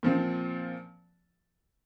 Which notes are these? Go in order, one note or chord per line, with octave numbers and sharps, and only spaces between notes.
A#2 F3 C4